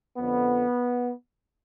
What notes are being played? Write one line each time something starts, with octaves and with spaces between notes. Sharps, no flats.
F2 D3 F3 B3